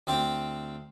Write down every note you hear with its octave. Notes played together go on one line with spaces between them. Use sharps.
D2 C4 G4